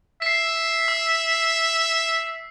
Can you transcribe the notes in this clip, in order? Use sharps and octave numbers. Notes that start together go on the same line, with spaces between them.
E5 B6 C7
E6